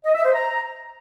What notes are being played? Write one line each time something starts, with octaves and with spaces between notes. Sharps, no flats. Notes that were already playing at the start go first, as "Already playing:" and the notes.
D#5
E5
C5
A#5